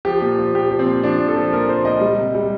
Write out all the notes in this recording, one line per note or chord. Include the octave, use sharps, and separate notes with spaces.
F3 G4
A#2
F3
A#2 G4
F3
C4
A#2
F3 D4
A#2
A4
F3
A#2 A#4
F3 C5
A#2 D#5
G3
C3
G3